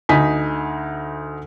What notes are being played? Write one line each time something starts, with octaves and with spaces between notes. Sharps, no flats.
D2 D#4 G#5 B6